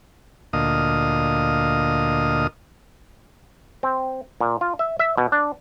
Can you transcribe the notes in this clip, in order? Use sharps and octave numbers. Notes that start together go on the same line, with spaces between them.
D2 A#2 D#5 F5 D#6
C4
A#2
F4
E5
E5
B2
D4